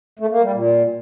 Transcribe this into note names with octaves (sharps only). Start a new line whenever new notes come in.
A3
A#3
G3
A#2